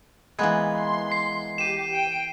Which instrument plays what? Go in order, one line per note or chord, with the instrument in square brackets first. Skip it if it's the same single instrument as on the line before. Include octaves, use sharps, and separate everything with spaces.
[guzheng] E3 A#3 B3 [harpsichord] G#3
[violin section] C6
[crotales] C7
[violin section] G4 [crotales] D#7 E7
[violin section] G5 D7